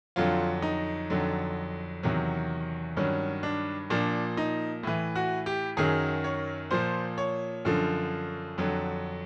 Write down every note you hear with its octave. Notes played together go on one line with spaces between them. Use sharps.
F2 D3 F#3 F4
D#4
F2 D3 F#3
E2 C3 D#3 F#3
G2 D#3 F#3 C#4
D4
A#2 F3 D4
D#4
A2 E3
F#4
G4
F#2 D#3 F#3 G#4
C#5
A#2 F3 C5
C#5
F#2 D3 F3
F2 D3 F#3